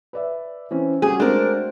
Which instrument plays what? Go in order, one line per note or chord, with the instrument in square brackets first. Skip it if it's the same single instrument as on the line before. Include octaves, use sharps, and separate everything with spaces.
[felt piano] B4 D5 E5
E3 C4 C#4
[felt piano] G3 C#4 [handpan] F#4 [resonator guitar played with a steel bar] G#4
[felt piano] G#3 [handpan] A3 C4 C5 [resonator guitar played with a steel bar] D4 A#4